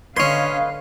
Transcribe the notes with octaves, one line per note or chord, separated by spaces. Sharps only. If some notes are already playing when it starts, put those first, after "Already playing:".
D3 C#4 B4 C#5 D#5 F5 C6